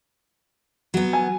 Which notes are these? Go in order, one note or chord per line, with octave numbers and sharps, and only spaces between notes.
F#3 B3
G#5